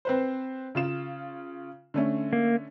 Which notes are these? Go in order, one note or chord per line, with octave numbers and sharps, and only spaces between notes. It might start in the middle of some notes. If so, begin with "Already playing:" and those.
C4 B4 C5
C#3 F4 E7
D3 A3 C#4
A#3